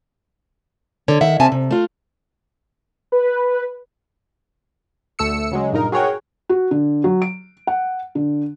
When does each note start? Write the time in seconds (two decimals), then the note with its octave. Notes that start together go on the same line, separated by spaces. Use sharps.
1.08 D3 C#5
1.21 D#3 E5 F#5
1.40 C3 C4 C#4 E5 G#5 A5
1.52 C3
1.71 A3 F4
3.12 B4
5.19 D2 A3 E6 C#7
5.51 C#3 F#3 G#3
5.72 G2 A#2 D#4 A#4
5.92 F#4 G#4 A#4 C#5 F#5 G5
6.49 F#4
6.71 D3
7.04 F#3
7.22 D7
7.67 F#5
8.15 D3